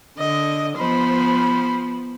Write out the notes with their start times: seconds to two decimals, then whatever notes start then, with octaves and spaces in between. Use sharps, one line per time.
0.18 D3 D#5
0.77 F3 B3 C5 B5